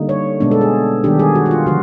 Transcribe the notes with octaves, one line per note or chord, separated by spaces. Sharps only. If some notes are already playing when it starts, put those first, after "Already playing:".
Already playing: D3 G3 A#3 D#4
C#5
B2 G#3 B3 D4
A4
G#4
D#3 G3 B3 D4 G4
G#4
F#4
F#4
F4
D3 F3 F#4